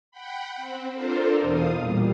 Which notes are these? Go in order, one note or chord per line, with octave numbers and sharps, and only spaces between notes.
F#5 G5 B5
C4
D4 F4 A4 A#4 C5
E2 B2 F5 D#6
A#2 G3